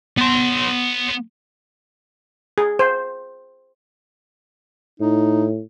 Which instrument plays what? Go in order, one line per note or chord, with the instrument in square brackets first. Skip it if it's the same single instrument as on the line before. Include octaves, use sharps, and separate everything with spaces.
[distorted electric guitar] B3 C6
[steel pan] G#4
C5
[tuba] A2 [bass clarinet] D#4